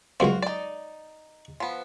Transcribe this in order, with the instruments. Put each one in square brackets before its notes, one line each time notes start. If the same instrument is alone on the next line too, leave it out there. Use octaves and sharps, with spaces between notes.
[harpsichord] C#2 F#2 C4 [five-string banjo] F4 F#4
[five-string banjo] D#4 D5
F3 B3